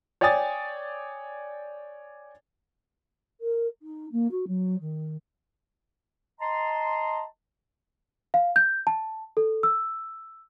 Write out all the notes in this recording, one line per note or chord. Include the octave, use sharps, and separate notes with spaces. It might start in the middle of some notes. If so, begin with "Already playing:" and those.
C#5 D5 G5 G#5 D#6 A6
A#4
D#4
A#3
F#4
F#3
D#3
D#5 A5 A#5 C6
F5
G6
A5
A4
E6